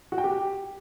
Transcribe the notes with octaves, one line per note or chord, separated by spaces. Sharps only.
F#4
G5
G4